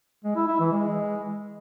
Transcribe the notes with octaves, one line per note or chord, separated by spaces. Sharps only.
G#3
E4
E4
E3
G#3